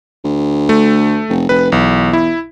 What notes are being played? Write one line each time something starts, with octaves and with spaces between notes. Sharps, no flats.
D2
A3
F1
F1 B4
B1 E2
E4